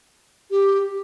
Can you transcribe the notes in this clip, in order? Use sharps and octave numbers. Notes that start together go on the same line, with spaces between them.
G4